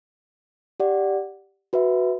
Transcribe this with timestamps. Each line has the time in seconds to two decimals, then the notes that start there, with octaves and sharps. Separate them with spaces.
0.80 G4 D5 F#5
1.73 F#4 B4 E5